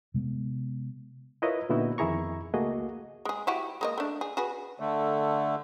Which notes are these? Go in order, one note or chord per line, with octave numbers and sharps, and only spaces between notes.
C3 G#3 B3
E4 F4 A#4 B4 C#5 D#5
A#2 D3 B3 D#4 E4 F#4
F2 D#3 E4 G#4 A#5 C#6
C#2 A3 A#3 F#4 G#4 D#5
G#3 G#4
E4 F#4 G4
G#3 A#3 D#5
A3 D4
G#4
F#4 G#4 B4
D3 A3